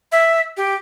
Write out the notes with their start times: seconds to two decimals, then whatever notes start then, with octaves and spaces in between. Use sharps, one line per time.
0.12 E5
0.57 G4